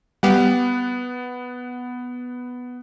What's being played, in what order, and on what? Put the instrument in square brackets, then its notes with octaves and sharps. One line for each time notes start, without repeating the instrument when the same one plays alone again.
[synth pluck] G3 G4 F5 [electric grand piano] B3 F#5